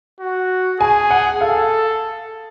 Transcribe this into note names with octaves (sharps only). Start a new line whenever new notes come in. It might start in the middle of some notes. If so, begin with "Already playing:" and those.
F#4
G#4 G#5
F#5
A4 F5